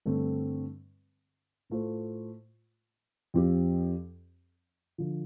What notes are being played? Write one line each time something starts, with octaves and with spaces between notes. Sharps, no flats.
G2 D3 A3 C4
A2 A3 F4 C5
F2 F3 C4 G4
D3 F3